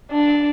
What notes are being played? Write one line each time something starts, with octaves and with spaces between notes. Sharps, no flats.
D4